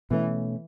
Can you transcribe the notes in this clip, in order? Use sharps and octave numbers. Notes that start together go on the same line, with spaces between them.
B2 E3 A3 C#4